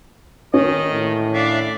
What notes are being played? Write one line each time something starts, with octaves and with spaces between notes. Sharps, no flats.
D#3 C#4 D#5
A2
D4 D5 E5 F5